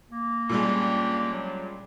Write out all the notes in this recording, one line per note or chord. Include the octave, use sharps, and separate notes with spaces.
A#3
A#2 G3 G#3 C#4 D4 G4
F#3